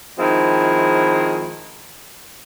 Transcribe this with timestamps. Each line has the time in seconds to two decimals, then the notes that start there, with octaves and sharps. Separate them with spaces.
0.18 D#3 F3 G#3 C4 E4